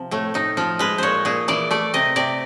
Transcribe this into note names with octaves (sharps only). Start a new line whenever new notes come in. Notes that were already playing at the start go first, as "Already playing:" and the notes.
Already playing: C3 F3
A2 A3
A2 D#4
F3 F4
G#3 B4
A#2 C5 C#5
A#2 G#4
E3 D5
A3 D5
C3 D#5
C3 D5